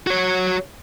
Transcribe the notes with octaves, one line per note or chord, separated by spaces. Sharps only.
F#4 C#5